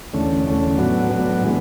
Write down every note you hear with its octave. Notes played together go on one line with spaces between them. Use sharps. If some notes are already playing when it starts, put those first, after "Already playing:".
E2 D3 A3 C#4
E2 D3 A3 C#4
A2 F#3 B3 D4 F#4
A2 F#3 B3 D4 F#4
A2 E3 G#3 B3